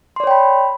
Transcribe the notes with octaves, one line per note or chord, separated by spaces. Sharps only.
C#5 D5 G5 B5 C6